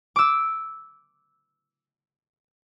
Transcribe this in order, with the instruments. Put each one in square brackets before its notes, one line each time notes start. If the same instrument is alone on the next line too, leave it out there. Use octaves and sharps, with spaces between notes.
[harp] D6 E6